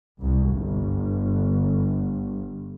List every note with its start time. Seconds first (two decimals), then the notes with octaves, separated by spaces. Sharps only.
0.23 C2
0.54 G1